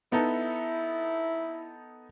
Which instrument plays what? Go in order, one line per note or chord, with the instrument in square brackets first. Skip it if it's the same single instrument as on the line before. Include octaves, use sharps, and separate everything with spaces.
[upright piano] B3 D#4 A4 [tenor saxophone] E4